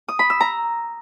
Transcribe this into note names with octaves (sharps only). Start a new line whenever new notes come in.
D#6
B5
E6
A#5